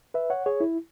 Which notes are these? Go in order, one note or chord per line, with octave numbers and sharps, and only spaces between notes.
B4 E5
C#5 F#5
G#4 C#5
E4